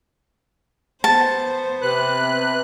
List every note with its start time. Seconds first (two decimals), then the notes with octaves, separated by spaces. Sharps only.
1.04 B3 C5 A5
1.82 C3 B4 F#6